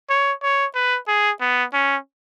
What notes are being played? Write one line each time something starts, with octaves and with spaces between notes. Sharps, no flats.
C#5
C#5
B4
G#4
B3
C#4